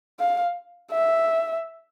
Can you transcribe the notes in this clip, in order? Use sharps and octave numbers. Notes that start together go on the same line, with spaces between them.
F5
E5